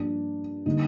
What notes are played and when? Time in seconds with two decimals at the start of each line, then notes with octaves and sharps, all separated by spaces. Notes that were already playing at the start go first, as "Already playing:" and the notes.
Already playing: G2 F3 A#3 D4
0.66 D3 G3 A#3 D#4